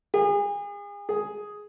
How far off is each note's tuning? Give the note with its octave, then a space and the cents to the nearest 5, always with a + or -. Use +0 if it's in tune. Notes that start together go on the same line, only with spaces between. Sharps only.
G#4 -35
G#4 +5